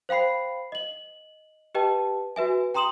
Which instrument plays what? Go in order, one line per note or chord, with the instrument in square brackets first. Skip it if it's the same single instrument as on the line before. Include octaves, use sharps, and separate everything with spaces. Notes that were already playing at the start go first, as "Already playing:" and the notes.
[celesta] C5 F5 G5 B5 C7
D#5 F#7
G4 B4 D#5 G5 A5
F#4 B4 E5 G#5
G5 A#5 C6 D#6 E7 F#7